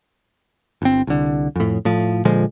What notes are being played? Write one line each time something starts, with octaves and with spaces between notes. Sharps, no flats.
G1 C4
C2 D3
F2 A2
A2 F3
A#2 D3 F3 G#3